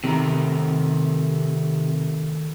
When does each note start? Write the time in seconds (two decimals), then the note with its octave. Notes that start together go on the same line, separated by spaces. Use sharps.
0.04 C3 D#3 A3 A#5